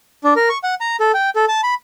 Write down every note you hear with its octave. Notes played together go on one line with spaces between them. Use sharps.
D4
A#4
C#6
F#5
A#5
A4
G5
A4
A5
B5